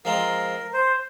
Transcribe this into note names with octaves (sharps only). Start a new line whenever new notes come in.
F3 G#3 C4 F4 A#4
C5